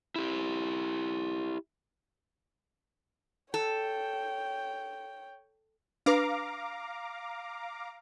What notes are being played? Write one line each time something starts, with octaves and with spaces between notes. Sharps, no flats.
E4 G4
A4 C#5 G5
D4 B4 F5 A#5 D6